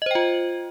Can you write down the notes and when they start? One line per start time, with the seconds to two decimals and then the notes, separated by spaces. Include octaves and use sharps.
0.02 D#5
0.06 C5
0.11 G5
0.15 F4